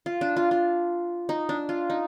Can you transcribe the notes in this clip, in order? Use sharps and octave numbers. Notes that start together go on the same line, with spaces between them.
F4
D4
F4
F4
D#4
D4
F4
D#4